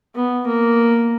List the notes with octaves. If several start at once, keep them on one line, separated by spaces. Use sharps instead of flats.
B3
A#3